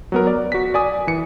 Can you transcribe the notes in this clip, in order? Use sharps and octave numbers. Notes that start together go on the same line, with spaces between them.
F#3 B3 A#4
D5
F#4 B6
D5 G#5 D#6
E3 C#7